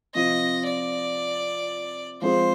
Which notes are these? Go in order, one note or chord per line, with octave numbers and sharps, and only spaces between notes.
C3 F3 C4 F4 D#5
D5
F3 G#3 C4 F4 G#4 C5